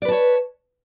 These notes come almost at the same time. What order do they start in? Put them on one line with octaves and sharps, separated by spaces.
D5 B4 A5 C#5